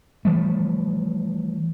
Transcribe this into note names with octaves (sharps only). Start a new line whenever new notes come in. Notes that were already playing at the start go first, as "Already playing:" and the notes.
E3 F3 G3 A3